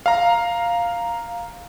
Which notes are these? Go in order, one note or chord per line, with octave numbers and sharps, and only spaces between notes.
F5 A#5